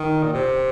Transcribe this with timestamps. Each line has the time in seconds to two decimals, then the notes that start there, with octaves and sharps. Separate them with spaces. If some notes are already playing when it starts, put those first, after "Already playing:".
Already playing: D#3
0.23 A#2
0.33 C3